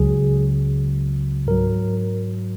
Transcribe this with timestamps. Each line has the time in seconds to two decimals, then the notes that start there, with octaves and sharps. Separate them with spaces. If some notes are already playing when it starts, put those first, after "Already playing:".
Already playing: C#2 C#3 F#3 G#4
1.47 G#2 F#3 A#4